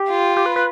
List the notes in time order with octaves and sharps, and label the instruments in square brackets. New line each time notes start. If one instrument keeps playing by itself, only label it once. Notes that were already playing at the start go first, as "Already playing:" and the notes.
Already playing: [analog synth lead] G4
[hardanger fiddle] F4
[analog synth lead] G4
B4
B4